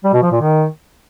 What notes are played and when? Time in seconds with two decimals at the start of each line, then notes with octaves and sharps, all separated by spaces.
0.04 G3
0.13 B2
0.23 F3
0.32 A#2
0.41 D#3